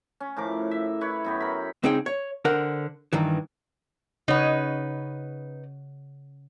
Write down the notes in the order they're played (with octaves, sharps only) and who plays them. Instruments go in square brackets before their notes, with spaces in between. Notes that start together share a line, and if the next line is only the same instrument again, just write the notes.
[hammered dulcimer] C#4
A2 F3 A#4 D6
E5
E4 B4 C#5
F#2 B3 G5
A#4 B5
[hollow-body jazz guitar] C#2 C4 D#4 G#4 G5
C#5
D3 A#4 C5 F#5
G2 D#3 E3
[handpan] C#3 C#5 F#5 [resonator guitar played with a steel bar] D#4 B4